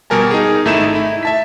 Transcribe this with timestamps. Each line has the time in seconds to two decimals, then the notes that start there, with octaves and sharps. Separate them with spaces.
0.10 B2 G3 G4 A#4 G#5 A5
0.31 D#4 G#4
0.65 G#1 A3 D#4 E4 E7
0.95 E4
1.23 E5 A5 B6